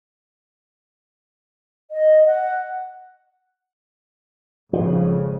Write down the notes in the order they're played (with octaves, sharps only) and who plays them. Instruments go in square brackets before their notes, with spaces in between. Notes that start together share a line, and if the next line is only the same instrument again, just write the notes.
[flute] D#5
F#5
[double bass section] G#1 F2 C#3 [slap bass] F3